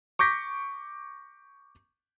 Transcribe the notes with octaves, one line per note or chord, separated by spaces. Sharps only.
C#6 D6 G6 A#6 B6